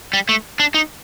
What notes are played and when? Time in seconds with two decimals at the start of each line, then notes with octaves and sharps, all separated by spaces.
0.13 G3
0.29 A3
0.60 D4
0.74 D#4